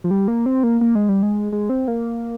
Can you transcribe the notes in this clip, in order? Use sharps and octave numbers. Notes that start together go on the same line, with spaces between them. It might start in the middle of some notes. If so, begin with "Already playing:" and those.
F3
G3
A#3
C4
A#3
A#3
G#3
G3
G#3
G#3
C4
A#3